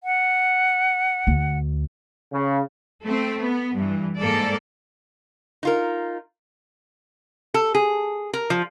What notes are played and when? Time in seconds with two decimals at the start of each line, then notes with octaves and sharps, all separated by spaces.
0.04 F#5
1.27 D2
2.32 C#3
3.03 A3 C4
3.40 B3
3.74 G2 E3
4.17 G#2 A#3 A4 D5
5.63 D#4 F4 A#4
7.54 A4
7.75 G#4
8.34 A#4
8.50 F3